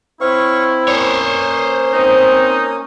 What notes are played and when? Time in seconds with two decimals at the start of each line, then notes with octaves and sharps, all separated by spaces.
0.21 C4 E4 C#5 F5 C#6
0.88 A#3 C#4 C5 C#5 D#6
1.93 C4 D#4